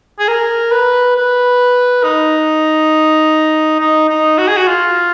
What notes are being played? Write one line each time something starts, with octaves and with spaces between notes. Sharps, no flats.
G#4
A#4
B4
B4
D#4
D#4
D#4
F#4
G#4
F#4
F4